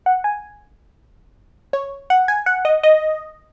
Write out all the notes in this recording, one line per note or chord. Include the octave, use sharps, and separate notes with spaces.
F#5
G#5
C#5
F#5
G#5
F#5
D#5
D#5